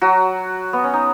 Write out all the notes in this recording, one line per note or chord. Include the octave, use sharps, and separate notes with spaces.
F#3 F#4
B3
C#4
D#4